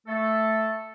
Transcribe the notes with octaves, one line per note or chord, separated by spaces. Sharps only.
A3 A4